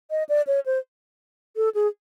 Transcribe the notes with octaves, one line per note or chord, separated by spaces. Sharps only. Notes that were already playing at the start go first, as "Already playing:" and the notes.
D#5
D5
C#5
C5
A4
G#4